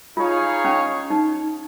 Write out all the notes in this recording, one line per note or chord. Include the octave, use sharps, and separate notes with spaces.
D#4 F4 G#4 C#5 F5
C#4
D#4